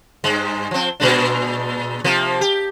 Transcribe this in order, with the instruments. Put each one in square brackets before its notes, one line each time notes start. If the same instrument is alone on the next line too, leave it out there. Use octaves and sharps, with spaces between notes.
[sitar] G2 G#3
F3 C4
A#2 G#3 D4
C3 F3 A#3
G4